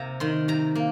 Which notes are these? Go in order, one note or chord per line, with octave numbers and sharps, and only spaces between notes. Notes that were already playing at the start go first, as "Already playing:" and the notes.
Already playing: C3 A#3 A#5
D#3 C6
C3 A#5
A#3